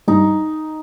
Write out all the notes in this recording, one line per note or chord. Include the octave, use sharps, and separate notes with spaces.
G2 D#4